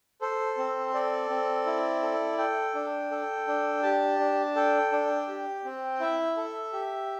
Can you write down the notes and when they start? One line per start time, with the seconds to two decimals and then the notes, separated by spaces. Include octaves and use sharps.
0.21 A4 C5
0.58 C4
0.94 A4 D5
1.30 C4
1.66 E4
2.02 A4
2.38 A4 G5
2.75 D4
3.11 A4
3.47 D4
3.83 G4 A5
4.20 D4
4.56 A4 G5
4.92 D4
5.28 G4
5.64 C4
6.00 E4 E5
6.37 A4
6.73 G4